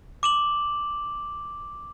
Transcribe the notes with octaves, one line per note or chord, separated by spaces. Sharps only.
D6 E7 F#7